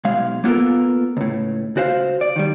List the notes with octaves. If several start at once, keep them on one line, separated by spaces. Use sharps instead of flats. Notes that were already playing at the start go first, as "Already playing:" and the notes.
B1 G#3 F5
A#3 B3 F4 A4 A#4
C#2 A2
C#2 F#4 C5 F5
D5
D#3 G3